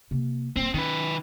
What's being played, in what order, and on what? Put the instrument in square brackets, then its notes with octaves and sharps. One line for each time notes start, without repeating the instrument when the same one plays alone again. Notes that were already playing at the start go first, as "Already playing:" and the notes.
[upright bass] C3 A#3
[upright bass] D#1 A#3 [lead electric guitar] C4
[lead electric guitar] D#3 B4 [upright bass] C#4